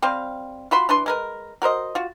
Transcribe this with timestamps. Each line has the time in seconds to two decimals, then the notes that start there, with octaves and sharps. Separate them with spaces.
0.02 G3 C4 C5 F5
0.71 F4 F#4 B5 C6
0.89 E3 D4 B4 C6
1.06 G#3 A#4 B4
1.62 F#4 A#4 C5 D#5
1.95 F4 F#4